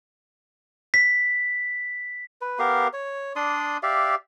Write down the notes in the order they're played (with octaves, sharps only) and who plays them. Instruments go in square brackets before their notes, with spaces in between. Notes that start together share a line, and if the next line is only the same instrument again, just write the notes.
[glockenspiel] B6
[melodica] B4
B3 G4 A#4 F5
C#5
D4 D5 C6 D#6
G4 D5 E5 F5